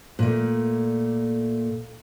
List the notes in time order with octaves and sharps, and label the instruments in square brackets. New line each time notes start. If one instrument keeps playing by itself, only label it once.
[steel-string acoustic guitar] A#2 A3